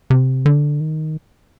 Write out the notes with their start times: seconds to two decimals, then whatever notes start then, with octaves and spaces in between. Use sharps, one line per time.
0.10 C3
0.46 D3
0.80 D#3